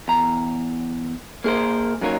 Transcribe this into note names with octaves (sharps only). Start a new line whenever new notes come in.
E2 A#5
A#3 G#4 A#4 C5
F#2 F#3 A#3 D#4 A#4 C#5